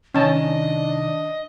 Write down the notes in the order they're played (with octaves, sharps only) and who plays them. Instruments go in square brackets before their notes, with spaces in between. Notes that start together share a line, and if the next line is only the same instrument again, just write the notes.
[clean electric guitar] C2 D#3 [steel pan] C#4 A5 [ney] D4 [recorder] D#5